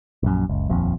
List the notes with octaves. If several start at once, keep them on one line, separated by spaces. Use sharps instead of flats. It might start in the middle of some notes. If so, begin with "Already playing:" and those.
A#1 F#2
F#1 C#2
D#1 A#1 F2